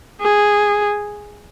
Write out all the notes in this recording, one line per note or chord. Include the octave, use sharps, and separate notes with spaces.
G#4